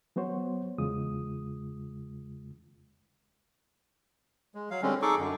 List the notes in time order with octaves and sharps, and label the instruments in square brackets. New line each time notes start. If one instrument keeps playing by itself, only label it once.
[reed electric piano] F#3 B3 F#4 C5 C#5
E2 C#3 G#3 F4 D#6
[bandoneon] G#3
F#3 F5
D3 G3 G#3 C4 C#4
D#4 G#4 A4 C#6 D6
F#2 D3